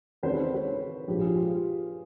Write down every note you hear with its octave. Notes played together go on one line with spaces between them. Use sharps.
D#2 C#3 E3 G#3 C4 A#4 C5
A4 B4
B4 C#5
A#1 G#2 F3 G#3 G4
G#4
F4 G4